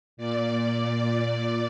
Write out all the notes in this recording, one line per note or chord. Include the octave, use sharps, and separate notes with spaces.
A#2 D5